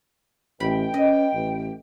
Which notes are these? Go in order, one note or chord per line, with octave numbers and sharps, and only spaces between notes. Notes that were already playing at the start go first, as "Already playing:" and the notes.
A1 B2 G5 B5
C#4 D#5
A1